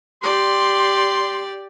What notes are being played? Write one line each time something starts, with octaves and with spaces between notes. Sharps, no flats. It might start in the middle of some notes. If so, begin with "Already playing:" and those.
G4 D5 C6